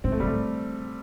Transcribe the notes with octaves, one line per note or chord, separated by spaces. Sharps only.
A2 C4
A3
G3
A2 A3